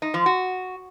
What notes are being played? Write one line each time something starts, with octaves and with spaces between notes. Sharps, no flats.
D#4
F3
F#4